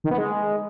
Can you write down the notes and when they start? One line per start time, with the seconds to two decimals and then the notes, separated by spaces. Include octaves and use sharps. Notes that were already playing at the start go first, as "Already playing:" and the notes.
0.04 D#3
0.11 B3
0.18 G#3